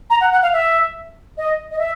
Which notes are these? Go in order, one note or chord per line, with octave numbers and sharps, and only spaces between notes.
A#5
F#5
F#5
F5
E5
D#5
D#5
E5